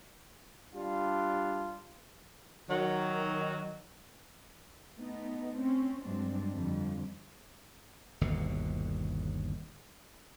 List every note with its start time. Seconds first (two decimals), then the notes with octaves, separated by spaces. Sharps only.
0.75 G3 D4 F4
2.69 D#3 F#3
4.96 A3 B3 D#4
5.57 C4 C#4
6.05 G2 F#3 G#3 C4 D4
6.52 F2 D3 G3
8.21 G1 D#2 B2 D3